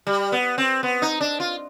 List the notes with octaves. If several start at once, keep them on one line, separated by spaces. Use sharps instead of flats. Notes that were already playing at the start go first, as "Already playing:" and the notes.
G3
B3
C4
B3
D#4
D4
F4